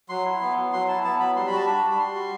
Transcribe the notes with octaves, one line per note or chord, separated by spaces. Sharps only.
F#3 C6
E4
B3
F#3
F#3 C6
E4 A5
B3 A5
F#3 B5
G3 C6
B5
F#4 A5
D4 B5
G3
B5
G3 C6
F#4